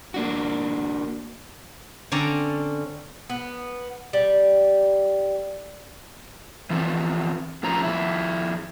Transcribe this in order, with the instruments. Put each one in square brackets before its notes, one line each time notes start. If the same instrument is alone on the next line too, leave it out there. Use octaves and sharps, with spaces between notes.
[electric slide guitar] A#3 D4 F#4
[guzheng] D3 C4 C#4 D5 A#5
[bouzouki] B3
G3
[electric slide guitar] E3 F3 B3 C4
A2 F3 C#4 A#5
F2 E4